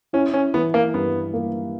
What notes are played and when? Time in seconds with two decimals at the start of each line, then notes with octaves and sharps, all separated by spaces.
0.13 C#4 E4
0.34 C#4
0.54 E3 B3
0.74 A#3
0.94 G2 B3
1.34 A#3